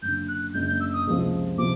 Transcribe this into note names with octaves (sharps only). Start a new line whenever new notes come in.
F#1 F#2 D3 G6
F#6
F#1 F#2 D3 G6
G6
E6
D#6
C#2 C3 F3
C3 F3 D6